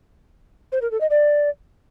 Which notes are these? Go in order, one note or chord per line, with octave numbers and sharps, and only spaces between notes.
C5
A#4
A4
D#5
D5